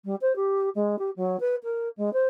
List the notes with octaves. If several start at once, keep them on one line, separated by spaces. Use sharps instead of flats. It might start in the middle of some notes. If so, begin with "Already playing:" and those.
G3
C5
G4
G#3
G4
F#3
B4
A#4
G#3
C5